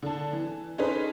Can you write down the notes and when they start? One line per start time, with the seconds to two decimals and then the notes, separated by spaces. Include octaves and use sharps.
0.02 D3 A5
0.33 E3
0.78 C#4 D#4 G#4 A4 B4 C5